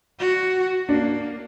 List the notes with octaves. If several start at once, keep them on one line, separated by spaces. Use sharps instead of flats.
F#4
A#3 D4